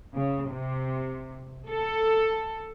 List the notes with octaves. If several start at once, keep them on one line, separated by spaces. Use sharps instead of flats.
C#3
C3
A4